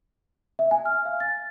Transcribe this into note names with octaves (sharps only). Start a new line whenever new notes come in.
E5
G#5
F6
F5
A6